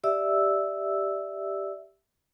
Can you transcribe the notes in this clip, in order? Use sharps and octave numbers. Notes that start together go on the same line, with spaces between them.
G4 D5 E5 E6